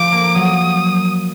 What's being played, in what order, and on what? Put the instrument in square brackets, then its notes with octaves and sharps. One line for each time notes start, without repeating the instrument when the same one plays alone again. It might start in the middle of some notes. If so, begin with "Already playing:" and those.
Already playing: [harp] F3 [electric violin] D6
[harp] A#3
[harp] F#3 [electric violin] D#6